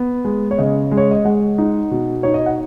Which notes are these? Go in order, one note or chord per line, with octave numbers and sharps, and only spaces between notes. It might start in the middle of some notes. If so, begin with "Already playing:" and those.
Already playing: B3
G#3
C#5
C#3 D#5
G#3
C#5
D#5
G#3 F#5
D#4
B2
D#4 C#5
D#5
F#5